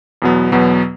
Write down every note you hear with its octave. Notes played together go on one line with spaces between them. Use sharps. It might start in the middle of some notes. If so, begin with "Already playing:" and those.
E2 B2 F#3 B3
E2 B2 F#3 B3